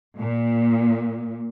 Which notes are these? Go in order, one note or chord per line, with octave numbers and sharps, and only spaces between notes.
A#2